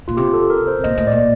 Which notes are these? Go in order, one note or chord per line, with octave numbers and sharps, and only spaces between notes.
A#2 F4
C3 G4
A4
A#4
C5
A#2 D#5
A2
A#2 D5